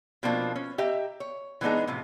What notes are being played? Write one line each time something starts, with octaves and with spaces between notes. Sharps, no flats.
B2 F3 A#3 C4 D4 F4
C#4
G4 D#5 E5 A#5
C#5
E3 G#3 B3 D4 D#4 G#4
A2 C3 F3